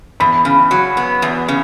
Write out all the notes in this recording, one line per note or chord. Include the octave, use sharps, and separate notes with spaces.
E2 B5
C#3
F#3
B3
E2
C#3